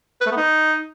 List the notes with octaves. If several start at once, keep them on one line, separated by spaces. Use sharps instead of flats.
B4
A3
B3
D#4